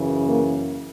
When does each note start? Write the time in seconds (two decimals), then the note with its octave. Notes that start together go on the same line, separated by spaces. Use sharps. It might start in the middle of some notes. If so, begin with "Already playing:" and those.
Already playing: F#2 C#3 E3
0.25 A#3 A#4